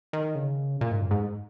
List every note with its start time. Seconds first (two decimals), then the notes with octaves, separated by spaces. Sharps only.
0.13 D#3
0.35 C#3
0.81 A#2
0.91 G#2
1.02 F#2
1.11 G#2